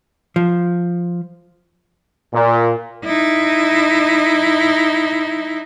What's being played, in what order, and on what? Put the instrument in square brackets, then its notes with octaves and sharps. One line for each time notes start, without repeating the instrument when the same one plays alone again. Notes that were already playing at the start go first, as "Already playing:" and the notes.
[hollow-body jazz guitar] F3
[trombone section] A#2
[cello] D#4 E4